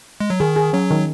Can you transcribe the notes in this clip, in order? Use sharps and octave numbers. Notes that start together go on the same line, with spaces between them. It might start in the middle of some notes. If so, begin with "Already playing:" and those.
G#3
F#3
D#3 G#4
G#4
F#3 C#4
D#3